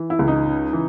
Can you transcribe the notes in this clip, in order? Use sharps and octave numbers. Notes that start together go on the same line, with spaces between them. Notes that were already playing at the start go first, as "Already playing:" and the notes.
Already playing: E3
E4
C#2
D#4
C#3
E3